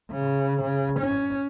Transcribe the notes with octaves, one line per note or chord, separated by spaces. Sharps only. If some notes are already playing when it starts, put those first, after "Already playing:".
C#3
C#3
C#4